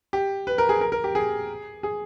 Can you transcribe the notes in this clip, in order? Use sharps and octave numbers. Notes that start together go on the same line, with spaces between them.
G4
B4
A#4
G#4
A#4
A#4
G4
G#4
G#4